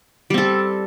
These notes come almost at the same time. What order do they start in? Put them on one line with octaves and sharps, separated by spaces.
G3 C4 A4